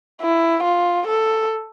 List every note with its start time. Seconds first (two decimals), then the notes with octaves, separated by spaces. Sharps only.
0.21 E4
0.64 F4
1.08 A4